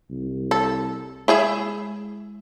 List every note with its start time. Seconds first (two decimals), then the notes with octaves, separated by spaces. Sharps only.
0.10 C2
0.51 A4
1.28 G#3 E4 G#4 E5